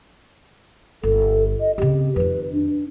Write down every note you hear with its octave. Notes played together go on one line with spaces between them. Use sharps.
G1 A4
D#5
C#3 C4 G4
F2 D#3 B4
D4